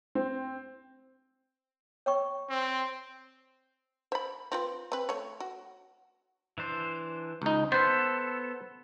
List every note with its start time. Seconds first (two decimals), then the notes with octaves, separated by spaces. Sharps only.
0.15 C4
2.06 C#5 G5 C#6
2.49 C4
4.12 C5 B5
4.52 C4 F4 B4
4.92 C4 B4
5.09 A3 C#5
5.40 F#4
6.58 E3 D4 C5
7.42 C#2 D#4
7.72 B3 A4 B4 C5